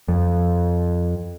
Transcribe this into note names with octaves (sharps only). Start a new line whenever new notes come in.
F2